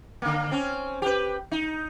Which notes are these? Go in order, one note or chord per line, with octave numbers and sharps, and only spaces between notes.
D3 A#3
C4 C#4
G4 B4
D#4